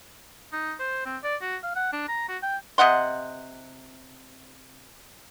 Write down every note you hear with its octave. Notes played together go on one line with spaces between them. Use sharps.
D#4
C5
C4
D5
F#4
F5
F#5
D4
A#5
F#4
G5
C3 D#5 F#5 C6